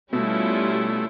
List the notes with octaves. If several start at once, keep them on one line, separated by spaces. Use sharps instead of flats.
B2 G3 A3 C#4 E4 F4